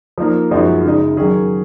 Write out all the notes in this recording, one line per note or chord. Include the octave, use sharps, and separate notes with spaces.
F3 A#3 D#4 A#4
F#2 F3 G#3 D#4 F#4
C#3 G#3 D#4
D#3 F#3 C#4 G#4